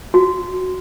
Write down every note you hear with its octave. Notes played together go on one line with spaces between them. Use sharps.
F#4